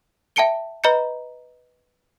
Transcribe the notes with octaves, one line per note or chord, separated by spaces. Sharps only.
E5 G5 A5 C#7 D7 G7
B4 D#5 A#5 B5 G6 C#7